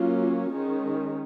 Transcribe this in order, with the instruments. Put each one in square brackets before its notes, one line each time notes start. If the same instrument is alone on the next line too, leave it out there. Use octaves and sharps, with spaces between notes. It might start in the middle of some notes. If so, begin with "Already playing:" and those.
Already playing: [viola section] F#3 A#3 C#4 F4
D#3 G#3 C#4